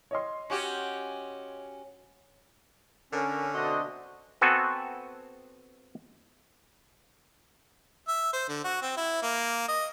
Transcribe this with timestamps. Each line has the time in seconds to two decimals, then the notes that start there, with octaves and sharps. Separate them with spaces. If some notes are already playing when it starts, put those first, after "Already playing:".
0.11 C#5 D#5 C6
0.50 C#4 F#4 G4
3.12 D3 C#4 A#4
3.55 B2 A3 C4 D4 F#4 D#5
4.41 B3 C4 F#4 A4 G#5
8.08 E5
8.33 C5
8.49 D3
8.64 F#4
8.82 C4
8.97 E4
9.23 A#3
9.68 D#5